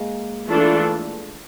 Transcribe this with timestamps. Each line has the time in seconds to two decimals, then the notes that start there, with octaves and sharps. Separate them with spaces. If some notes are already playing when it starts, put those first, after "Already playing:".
Already playing: G#3 A#3
0.49 E3 A3 D4 F4 A4